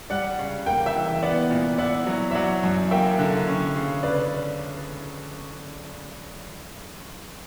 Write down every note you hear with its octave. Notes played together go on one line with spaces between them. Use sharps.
G3 D5 F#5
C#3
A#3 G5
E5 G5
E3
B3 D5 F#5
A#2
E4 D5 F#5
F#3
E5
F#3 D5 F#5
F#2
A#3 E5 G5
D3
C#4
C#3
C#3 B4 D5